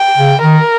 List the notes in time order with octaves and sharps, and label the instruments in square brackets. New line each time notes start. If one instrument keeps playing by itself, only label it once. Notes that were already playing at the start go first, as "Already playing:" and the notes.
Already playing: [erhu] G5
[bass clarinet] C#3
[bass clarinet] D#3 [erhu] A#4